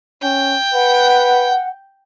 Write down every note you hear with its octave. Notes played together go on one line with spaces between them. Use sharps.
C#4 G5
B4 F#5